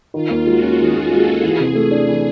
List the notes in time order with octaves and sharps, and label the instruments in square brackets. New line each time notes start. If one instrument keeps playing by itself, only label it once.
[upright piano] D#3 [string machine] F4
[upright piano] D#2
[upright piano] G#3 [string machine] F#4
[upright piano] C#4
[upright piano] D#3 [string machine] G#4
[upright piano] D#2
[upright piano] G#3 [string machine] A4
[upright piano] C#4
[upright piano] E3 [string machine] G#4
[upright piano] C3
A3
D4
E3